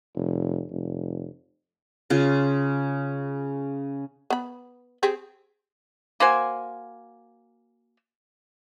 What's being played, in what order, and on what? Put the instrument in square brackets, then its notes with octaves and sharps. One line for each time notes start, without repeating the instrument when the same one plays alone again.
[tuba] F1
F1
[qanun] C#3 F4
[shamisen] B3 B5
C4 G4 G#4
[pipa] A#3 F#4 C5 G#5